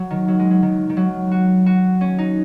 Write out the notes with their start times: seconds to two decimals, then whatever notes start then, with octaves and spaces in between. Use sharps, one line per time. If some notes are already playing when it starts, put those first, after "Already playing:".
Already playing: F#3
0.11 D#3
0.28 F#3
0.39 G#3
0.51 F#3
0.63 D#3
0.90 D#3
0.97 F#3
1.32 F#4
1.66 F#4
2.01 C#4
2.18 D#4